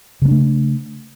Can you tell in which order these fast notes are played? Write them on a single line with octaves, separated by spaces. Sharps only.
C#3 G#3 D4 A3